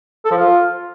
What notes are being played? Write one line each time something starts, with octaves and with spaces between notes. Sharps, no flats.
A4
F3
F4